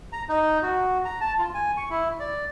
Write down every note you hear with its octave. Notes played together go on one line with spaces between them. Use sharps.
A#5
D#4
F#4
A#5
A5
F4
G#5
C#6
E4
D5